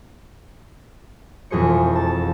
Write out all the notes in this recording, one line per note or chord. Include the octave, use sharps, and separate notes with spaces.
E1 F2 G#4 C5 C#7
A5